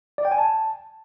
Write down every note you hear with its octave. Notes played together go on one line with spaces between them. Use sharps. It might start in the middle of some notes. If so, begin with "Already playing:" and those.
D5
G5
G#5
A5